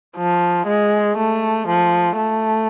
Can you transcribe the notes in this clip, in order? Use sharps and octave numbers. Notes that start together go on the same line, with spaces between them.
F3
G#3
A3
F3
A3